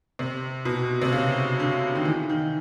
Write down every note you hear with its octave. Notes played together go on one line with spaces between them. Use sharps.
C3
B2
C3
C#3
D3
D#3
E3
D#3